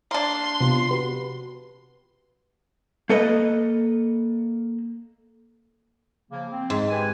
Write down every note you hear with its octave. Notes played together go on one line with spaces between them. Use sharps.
A#3 D4 C6
C3 B3 F4
F#4 G4 B4
A#3 A4 B4 D#5
C#3 F3 A#3
C4
G#2
G4 B4 G#5